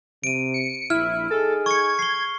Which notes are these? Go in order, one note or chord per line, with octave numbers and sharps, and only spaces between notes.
C3 D7 D#7
C#7
A#1 E4 F6
D#4 G#4 A4
C#6 G#6 C#7
C7 G7